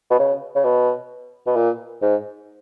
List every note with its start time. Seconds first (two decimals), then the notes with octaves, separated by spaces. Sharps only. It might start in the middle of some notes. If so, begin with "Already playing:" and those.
0.11 B2
0.19 C#3
0.55 C#3
0.64 B2
1.47 B2
1.56 A#2
2.02 G#2